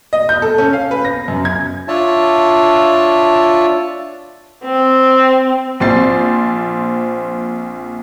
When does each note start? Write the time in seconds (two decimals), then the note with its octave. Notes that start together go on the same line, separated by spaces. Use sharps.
0.13 D#5
0.29 G6
0.42 A4
0.58 C#4
0.73 F5
0.91 B4
1.05 A#6
1.28 F#2
1.45 G#6
1.88 D4 F4 C#5 E5 A5
4.64 C4
5.80 A#1 C4 C6 A6 C7